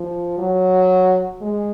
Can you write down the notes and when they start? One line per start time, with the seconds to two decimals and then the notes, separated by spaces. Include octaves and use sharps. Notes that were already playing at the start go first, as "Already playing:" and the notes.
Already playing: F3
0.38 F#3
1.42 G#3